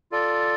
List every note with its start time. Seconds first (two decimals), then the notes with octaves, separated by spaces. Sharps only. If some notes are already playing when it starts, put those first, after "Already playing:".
0.12 F4 A4 D5